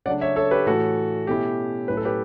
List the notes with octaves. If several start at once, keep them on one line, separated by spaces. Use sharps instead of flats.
C#3 F#3 A3 D4 D5 F#5
C#5 E5
A4 C#5
G4 B4
A2 E3 A3 E4 F#4 A4
B2 A3 C#4 E4 G4
A2 F#3 C#4 E4 B4
A4
G4 B4